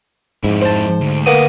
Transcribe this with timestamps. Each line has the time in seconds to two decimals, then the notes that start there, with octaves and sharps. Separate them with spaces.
0.44 F2 G#2 E4
0.62 C5 A5
1.01 D2
1.26 A#3 B3 D#6